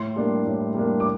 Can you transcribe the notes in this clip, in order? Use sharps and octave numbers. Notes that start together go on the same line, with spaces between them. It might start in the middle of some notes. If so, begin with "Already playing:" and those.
Already playing: A2 C6
G3 A#3 D4
A2
G3 A#3 D4
D6